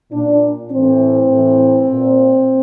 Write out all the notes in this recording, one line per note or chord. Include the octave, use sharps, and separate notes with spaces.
A#2 D4
A2 E3 C4
A2 E3
A#2